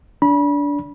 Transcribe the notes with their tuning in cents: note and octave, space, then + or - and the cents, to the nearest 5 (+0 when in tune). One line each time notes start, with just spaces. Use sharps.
D4 -25 B5 -30